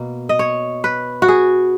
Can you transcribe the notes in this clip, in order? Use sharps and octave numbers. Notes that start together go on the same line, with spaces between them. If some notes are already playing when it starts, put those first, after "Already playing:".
Already playing: B2 A#3
D#5
C#5
B4
F#4
G#4